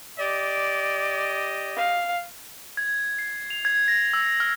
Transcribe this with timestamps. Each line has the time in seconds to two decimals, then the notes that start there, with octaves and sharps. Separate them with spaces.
0.18 G4 D5 D#5
1.76 F5
2.77 G#6
3.19 C7
3.50 F7
3.65 G#6
3.88 A#6
4.13 E6
4.40 F6